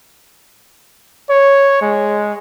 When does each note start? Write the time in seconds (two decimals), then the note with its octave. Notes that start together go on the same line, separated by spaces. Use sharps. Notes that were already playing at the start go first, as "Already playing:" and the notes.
1.30 C#5
1.82 G#3